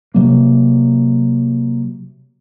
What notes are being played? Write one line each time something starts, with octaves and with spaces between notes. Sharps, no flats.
C3 F#3 A#3